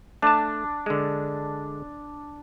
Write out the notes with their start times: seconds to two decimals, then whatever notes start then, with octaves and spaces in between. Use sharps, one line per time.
0.22 A3 D4 A5
0.86 D3 G#3